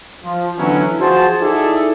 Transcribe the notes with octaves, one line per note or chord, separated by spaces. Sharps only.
F3
D3 E3 F#3 B3 C#4 E4
F3 F#4 G#4 C5 A5
D#4 E4 G#4 A4 D5 E5